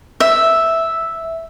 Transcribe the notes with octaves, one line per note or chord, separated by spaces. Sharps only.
E5